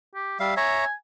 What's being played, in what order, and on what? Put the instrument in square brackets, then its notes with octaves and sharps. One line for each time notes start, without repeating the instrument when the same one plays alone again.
[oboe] G4
[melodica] G3 F5 [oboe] E5
[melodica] C#5 E5 A#5 [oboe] G#5